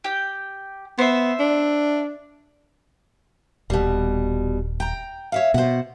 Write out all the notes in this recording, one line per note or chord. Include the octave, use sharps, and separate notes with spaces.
G4 G5
B3 C5 E5
D4
D#1 B2 G3
G5 A#5
C#5 E5 F5
B2 C5 F#5